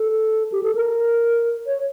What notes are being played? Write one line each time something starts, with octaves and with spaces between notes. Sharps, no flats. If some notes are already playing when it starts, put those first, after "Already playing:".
Already playing: A4
G4
A4
A#4
C#5